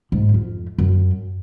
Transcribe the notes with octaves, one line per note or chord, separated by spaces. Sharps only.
G#2
F2
F#2